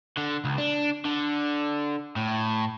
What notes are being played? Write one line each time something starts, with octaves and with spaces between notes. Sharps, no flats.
D3
C#2
D4
D3
A2